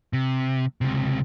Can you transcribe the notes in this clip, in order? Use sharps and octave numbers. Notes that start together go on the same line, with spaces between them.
C3
C#2 C3